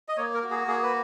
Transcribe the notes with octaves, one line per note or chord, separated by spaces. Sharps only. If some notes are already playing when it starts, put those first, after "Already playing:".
D#5
A#3 C#5
A#4
F#4
G#4
A#3 G#4
B4